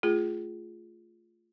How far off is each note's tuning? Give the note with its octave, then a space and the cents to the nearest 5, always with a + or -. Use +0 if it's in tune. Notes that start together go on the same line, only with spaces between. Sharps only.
A3 -5 F4 -5 G#4 +0